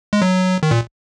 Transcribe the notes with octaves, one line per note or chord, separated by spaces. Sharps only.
G#3
F#3
D#3
A#2